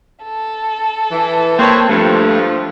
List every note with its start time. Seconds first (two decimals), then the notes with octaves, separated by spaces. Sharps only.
0.23 A4
1.12 E3
1.59 A#3 C4 B4 C#5
1.89 G2 F3 A3